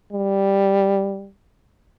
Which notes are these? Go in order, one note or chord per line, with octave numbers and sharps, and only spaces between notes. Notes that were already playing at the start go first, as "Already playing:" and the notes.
G3